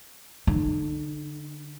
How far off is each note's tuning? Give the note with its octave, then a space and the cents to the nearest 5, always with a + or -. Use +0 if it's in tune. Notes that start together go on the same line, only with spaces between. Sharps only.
D3 -5 D#4 -40